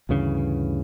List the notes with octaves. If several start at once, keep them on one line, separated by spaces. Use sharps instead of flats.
D2 G2 C#3 E3